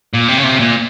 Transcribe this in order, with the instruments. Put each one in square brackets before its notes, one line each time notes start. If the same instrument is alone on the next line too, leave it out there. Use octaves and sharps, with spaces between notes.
[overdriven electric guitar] A#2
C3
C#3
C3
A#2